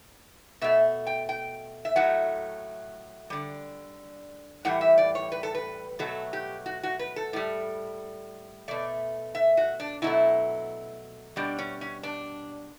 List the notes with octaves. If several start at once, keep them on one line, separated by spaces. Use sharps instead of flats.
B2 A3 E5
G5
G5
E5
A2 F#3 A3 F#5
D3 G3
A2 E3 G3 F#5
E5
D5
C#5
B4
A4
B4
B2 F#3 A3 A4
G4
F#4
F#4
B4
A4
A2 G3
B2 A3 D5
E5
F#4
D4
B2 F#3 A3 E4
B2 G3 D4
C#4
C#4
D4